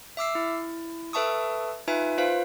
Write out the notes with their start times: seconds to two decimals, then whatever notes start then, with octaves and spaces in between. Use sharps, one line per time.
0.17 E5 D6 E6 C7
0.35 E4
1.13 A4 B4 E5 A5 C#6 D#6
1.88 D#4 F4 B4 E5 G#5
2.18 F4 B4 C5 F5